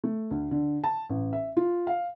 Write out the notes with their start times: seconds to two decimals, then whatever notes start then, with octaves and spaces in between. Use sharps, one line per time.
0.04 A3
0.31 D2
0.51 D3
0.84 A5
1.09 A1
1.33 E5
1.57 F4
1.87 F5